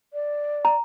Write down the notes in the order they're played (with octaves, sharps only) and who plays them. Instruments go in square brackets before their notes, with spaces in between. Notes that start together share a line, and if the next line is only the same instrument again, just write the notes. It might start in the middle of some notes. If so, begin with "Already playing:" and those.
[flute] D5
[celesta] A#5